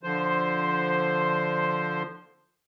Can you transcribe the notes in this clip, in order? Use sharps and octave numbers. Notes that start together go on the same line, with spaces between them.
D3 F3 C5